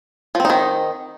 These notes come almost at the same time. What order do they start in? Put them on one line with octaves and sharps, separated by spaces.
F3 C4 D#4 D#3